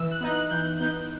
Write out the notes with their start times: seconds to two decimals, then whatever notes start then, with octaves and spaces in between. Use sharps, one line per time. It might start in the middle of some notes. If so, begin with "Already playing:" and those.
Already playing: E3 E6
0.11 F#6
0.21 B3 D#4
0.31 F#6
0.51 E3 G6
0.80 B3 D#4 G6